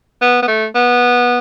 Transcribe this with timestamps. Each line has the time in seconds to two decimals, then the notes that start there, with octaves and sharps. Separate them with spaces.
0.21 B3
0.42 B3
0.48 A3
0.75 B3